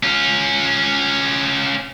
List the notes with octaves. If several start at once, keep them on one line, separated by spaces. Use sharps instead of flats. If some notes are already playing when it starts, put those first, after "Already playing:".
C#4 F4